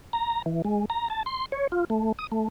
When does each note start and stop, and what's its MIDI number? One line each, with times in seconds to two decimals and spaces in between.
0.13 0.42 82
0.46 0.62 52
0.65 0.85 56
0.90 1.08 82
1.10 1.23 81
1.26 1.46 84
1.52 1.67 73
1.72 1.85 65
1.90 2.12 57
2.19 2.27 87
2.32 2.48 57